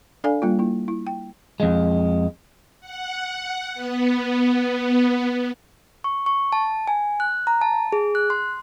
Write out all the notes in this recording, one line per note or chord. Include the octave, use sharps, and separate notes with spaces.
D4 A4 D5 F5 G#5
G3 A#3 F4
A#3 E4
E4
G5
F2 G#3
F#5
B3
C#6
C#6
A5
G#5
F#6
A#5
A5
G#4
F#6
C6